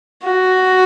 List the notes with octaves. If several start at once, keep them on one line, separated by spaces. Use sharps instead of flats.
F#4